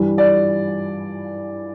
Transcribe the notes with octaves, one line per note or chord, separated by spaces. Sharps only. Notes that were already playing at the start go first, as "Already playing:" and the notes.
Already playing: G2 E3 G3
D5